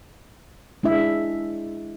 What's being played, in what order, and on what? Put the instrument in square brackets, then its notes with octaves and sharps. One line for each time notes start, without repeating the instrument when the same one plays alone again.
[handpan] G#3 D4 E4 E5